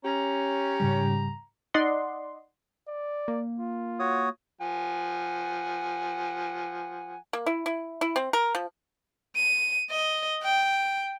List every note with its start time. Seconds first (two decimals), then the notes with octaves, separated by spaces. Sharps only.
0.05 C#4 G4 A#5
0.80 G#2 C#3 G3
1.74 D#4 D5 D#5 F#5 C6
2.88 D5
3.28 A#3
3.60 F4
3.99 F#4 C#5 D#6
4.61 F3 F#5 G#5
7.33 A#3
7.46 E4
7.66 E4
8.01 E4
8.16 C4
8.33 A#4
8.55 F3
9.36 D#7
9.91 D#5
10.43 G5